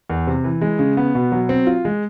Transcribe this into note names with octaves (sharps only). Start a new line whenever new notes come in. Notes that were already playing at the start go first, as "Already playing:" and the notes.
E2
C3
E3
G#3
C#3
B3
B2
F#3
C4
F4
G#3